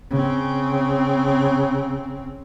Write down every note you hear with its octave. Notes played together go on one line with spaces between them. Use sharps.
C#3 C4